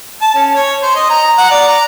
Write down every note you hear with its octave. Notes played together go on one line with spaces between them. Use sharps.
A5
C#4
C#5
C5
D#5
A#5
F#5
D5
A#5